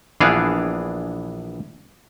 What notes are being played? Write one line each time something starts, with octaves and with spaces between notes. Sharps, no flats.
A#1 E3 B3 D4 G#4 F5